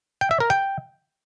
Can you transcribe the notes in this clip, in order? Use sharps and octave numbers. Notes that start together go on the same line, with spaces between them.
G5
E5
A#4
G5